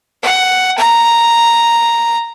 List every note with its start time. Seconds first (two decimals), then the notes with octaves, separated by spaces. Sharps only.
0.22 F#5
0.78 A#5